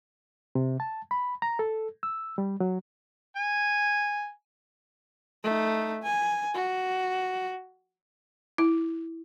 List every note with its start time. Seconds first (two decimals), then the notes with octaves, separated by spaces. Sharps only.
0.55 C3
0.80 A5
1.11 B5
1.42 A#5
1.59 A4
2.03 E6
2.38 G3
2.60 F#3
3.36 G#5
5.43 A3 D#4
6.03 G#5
6.54 F#4
8.58 E4